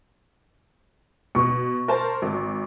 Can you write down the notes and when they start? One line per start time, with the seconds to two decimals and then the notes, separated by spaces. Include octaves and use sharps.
1.35 B2 C#6
1.88 A#4 C5 A5
2.22 G#1